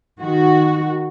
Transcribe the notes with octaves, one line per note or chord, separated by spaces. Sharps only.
D#3 F#4